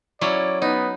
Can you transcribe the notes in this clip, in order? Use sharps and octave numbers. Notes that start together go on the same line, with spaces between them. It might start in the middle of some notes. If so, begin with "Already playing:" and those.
F#3 C#4 E4 D5
B3 D#4